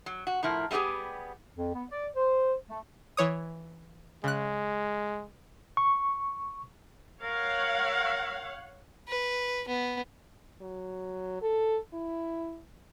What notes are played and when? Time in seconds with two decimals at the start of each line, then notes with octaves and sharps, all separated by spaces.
0.06 F#3
0.27 F#4
0.43 A2 F3 E4 A#4
0.71 G3 A3 B3 G4 G#4
1.56 F2
1.75 B3
1.92 D5
2.16 C5
2.70 A3
3.17 E3 C#5 D#6
4.24 C#3 G#3 F#6
5.77 C#6
7.22 A#4 C#5 F5 F#5
9.08 B4
9.68 B3
10.61 F#3
11.42 A4
11.93 E4